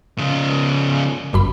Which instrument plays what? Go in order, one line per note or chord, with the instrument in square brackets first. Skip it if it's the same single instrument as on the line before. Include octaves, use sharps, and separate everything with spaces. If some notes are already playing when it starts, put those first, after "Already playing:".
[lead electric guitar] C#3 F3
[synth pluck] G1 F#2 B5